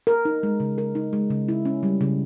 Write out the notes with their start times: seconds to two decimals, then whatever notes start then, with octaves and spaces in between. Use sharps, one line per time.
0.07 A#4
0.25 D#4
0.43 G#3
0.60 C#3
0.78 A#4
0.95 D#4
1.13 G#3
1.30 C#3
1.48 E4
1.65 C#4
1.83 G3
2.01 C#3